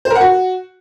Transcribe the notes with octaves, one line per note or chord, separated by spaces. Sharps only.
C5
A#4
F#5
F#4